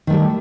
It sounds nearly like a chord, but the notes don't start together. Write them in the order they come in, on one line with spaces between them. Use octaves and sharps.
D#3 A3 G3